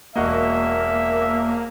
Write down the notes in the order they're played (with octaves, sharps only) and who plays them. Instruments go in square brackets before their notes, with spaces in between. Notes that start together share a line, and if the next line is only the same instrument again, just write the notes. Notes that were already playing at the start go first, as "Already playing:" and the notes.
[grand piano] E1 F#4 D#5 [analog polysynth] A#3 [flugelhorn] E5